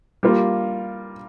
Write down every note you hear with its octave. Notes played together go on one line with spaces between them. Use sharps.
G3 A#3 F4